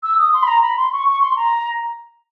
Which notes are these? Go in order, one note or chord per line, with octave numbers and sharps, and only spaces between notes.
E6
D#6
C6
B5
A#5
B5
C6
C#6
C#6
C6
A#5